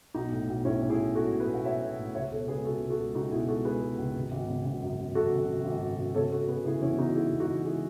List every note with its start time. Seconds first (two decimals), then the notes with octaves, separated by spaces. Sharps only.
0.14 B1 D#4
0.32 A2
0.48 B1
0.65 A2 C#4 E4
0.82 A2
0.89 E4 G#4
0.99 B1
1.15 G#3 F#4 A4
1.32 B1
1.40 G#4 B4
1.48 B1
1.54 F#5
1.65 B1 C#5 E5
1.82 B1
1.98 A2
2.15 C#2 C#5 E5
2.31 B2 A4 C#5
2.48 C#2 G#4 B4
2.65 C#2 F#4 A4
2.82 C#2
2.90 F#4 A4
2.98 G#3
3.15 C#2 D#4 F#4
3.32 B2 E4 G#4
3.48 G#3 F#4 A4
3.65 G#3 G#4 B4
3.82 G#3
3.98 C#2
4.15 G#1
4.32 G#1
4.48 C#3
4.65 G#1
4.82 F#2
4.98 F#2
5.15 F#2 F#4 A4
5.31 G#1
5.49 G#1
5.65 G#1
5.81 F#2
5.98 G#1
6.15 C#3 A4 C#5
6.31 C#3 F#4 A4
6.48 C#3 G#4 B4
6.65 C#3 E4 G#4
6.82 E2 C#4 E4
6.98 C#3 D#4 F#4
7.15 G#3 E4 G#4
7.32 E2
7.40 D#4 F#4
7.48 E2
7.65 G#3 E4 G#4